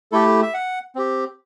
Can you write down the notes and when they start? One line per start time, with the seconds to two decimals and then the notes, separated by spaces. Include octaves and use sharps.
0.12 A3 E4 G4 A4
0.42 E5
0.54 F#5
0.95 C4 G4